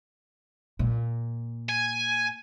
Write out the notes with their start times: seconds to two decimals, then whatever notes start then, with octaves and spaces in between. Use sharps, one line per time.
0.79 A#2
1.69 G#5